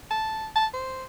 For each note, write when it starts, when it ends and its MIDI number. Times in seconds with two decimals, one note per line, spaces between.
0.11 0.48 81
0.56 0.67 81
0.74 1.04 72